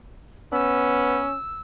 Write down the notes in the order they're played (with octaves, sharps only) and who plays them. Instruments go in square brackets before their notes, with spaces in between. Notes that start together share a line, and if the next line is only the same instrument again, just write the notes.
[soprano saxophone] B3 [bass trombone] C#4 [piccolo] E6